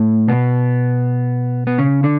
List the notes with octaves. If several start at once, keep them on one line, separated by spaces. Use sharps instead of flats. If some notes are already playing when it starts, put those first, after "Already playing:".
Already playing: A2 A3
B2 B3
B3
C#3 C#4
D3 D4